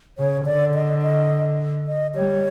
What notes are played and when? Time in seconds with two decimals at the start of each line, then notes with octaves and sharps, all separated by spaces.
0.18 C#3 C#5
0.46 D3 D5
0.74 D#5
1.03 D#5
1.88 D#5
2.15 G3 C#5